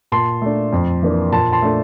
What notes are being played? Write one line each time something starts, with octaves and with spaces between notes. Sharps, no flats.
A#2 A5 C6
A3 D4
F2
E3 A#3 D4
A#2 A5 C6
A5 C6
A3 D4